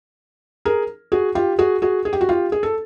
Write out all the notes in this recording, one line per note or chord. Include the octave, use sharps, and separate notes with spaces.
G#4 A#4
F#4 G#4
F4 G4
F#4 G#4
F#4 G#4
G#4
G4
F#4
F4 G4
G#4
A4